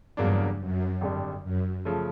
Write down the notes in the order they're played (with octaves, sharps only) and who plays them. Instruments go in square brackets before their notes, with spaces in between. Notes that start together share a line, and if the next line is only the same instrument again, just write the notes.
[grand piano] E2 C#3 F#3 A#3 D4 [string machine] G2
[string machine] F#2
[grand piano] G#1 G2 D3 G3
[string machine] F#2
[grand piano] C#3 F3 A3